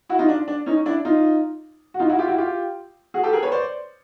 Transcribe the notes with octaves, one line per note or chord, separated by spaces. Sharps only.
E4 F#4
D#4 F4
D4
D4
C#4 D#4
D4 E4
D#4 F4
F#4
D#4 F4
E4 F#4
F4 G4
E4 F#4
F4 G4
F#4 G#4
G4 A4
G#4 A#4
B4 C#5
C5 D5